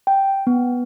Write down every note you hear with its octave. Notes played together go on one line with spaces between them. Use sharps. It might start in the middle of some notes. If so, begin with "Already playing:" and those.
G5
B3